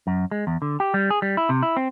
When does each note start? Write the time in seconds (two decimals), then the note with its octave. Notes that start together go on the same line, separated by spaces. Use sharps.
0.07 F#2
0.31 G#3
0.47 E2
0.62 D3
0.80 G4
0.94 G3
1.10 G#4
1.22 G3
1.37 E4
1.49 C3
1.63 E4
1.77 C4